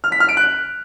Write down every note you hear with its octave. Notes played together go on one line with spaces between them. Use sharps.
F6
B6
F6
D7
F#6